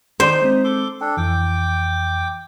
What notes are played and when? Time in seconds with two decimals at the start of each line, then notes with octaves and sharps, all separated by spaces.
0.20 D#3 D#4 C5 D5 D6
0.42 G#3 C4
0.64 A4 C6 D6
1.01 D4 A4 G5
1.17 F2 E3 G5 D6